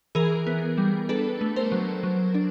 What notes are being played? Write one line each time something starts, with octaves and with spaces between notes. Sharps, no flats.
E3 G#4 A#4
B3
G3
D4 A4 B4
A3
A#4 C5
F#3
F#3
D4